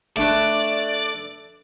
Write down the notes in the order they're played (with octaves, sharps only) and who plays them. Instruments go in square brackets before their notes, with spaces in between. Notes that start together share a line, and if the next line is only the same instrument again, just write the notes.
[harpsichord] A3 D4 B4 [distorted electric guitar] D5